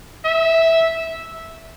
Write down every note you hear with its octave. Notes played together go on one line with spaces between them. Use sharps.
E5